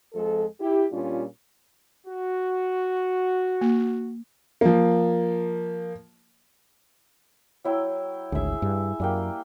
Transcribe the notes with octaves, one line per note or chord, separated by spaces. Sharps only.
F2 F3 G#3 A4
E4 G4
A#2 G3 C#4 D4 F4
F#4
A#3
F3 A#3
F#3 E4 G5
G#1 D2 G#4 E5
G2
F#2 G3 A#3 G5